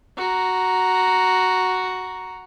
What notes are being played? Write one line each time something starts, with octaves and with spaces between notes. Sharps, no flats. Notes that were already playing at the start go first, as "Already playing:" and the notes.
F#4 A#5